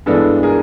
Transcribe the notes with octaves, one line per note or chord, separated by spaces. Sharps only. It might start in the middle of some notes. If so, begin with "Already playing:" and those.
G2 E3 G#3 B3 D4 A4
G#4 A#4